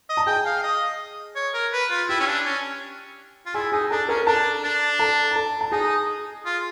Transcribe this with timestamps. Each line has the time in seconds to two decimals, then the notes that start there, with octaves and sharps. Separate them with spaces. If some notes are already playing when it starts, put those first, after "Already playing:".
0.09 D#5
0.17 A5
0.27 G#4 G5 G#5
0.45 F5
0.63 D#5
1.36 C#5
1.54 A#4
1.73 B4
1.90 F4
2.09 E4 G4 G5
2.20 C#4
2.27 D4
2.46 C#4
3.46 F4
3.54 E4 G#4 G#5
3.72 D#4 G#4 G#5
3.90 D4 A4 A5
4.09 C#4 A#4 A#5
4.27 D4 A4 A5
4.64 D4
4.99 A4 A5
5.31 A#5
5.36 A4 A5
5.61 A5
5.72 D#4 G#4 G#5
6.46 F4